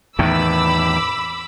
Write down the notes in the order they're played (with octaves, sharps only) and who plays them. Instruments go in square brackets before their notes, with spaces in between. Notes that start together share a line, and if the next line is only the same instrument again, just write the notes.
[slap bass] E2 A2 D#3 [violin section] B5 D6 E6